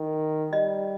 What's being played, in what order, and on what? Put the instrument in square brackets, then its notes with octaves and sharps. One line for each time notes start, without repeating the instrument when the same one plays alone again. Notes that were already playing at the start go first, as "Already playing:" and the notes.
Already playing: [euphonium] D#3
[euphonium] G3 [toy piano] D#5